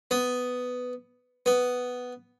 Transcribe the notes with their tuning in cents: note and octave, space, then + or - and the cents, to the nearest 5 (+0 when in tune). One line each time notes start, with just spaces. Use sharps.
B3 +10
B3 +5